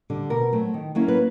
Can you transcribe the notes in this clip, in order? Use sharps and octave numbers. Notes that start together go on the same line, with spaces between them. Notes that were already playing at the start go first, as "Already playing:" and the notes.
D3 G3
B2 A#4
F#3 A3 C4
D#3
F#3 A#3 C#4 E4
B4